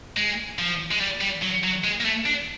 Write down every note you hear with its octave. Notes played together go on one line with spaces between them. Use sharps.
G#3
F3
G#3
G3
G3
F#3
F#3
G#3
A#3
A3
D4